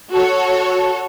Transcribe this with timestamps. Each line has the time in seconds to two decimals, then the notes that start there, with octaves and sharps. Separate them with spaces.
0.12 F#4 A4 C#5